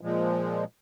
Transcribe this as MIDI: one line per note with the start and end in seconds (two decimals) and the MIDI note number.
0.01 0.64 46
0.01 0.64 53
0.01 0.64 56